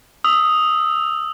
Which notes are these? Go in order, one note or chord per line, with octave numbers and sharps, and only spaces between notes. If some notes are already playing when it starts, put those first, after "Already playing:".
D#6 E6